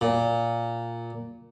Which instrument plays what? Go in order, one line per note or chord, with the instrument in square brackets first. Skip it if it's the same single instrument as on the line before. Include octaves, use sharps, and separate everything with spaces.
[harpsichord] A#2